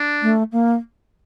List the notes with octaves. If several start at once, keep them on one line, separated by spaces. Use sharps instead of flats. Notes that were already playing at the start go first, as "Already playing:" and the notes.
Already playing: D4
A3
A#3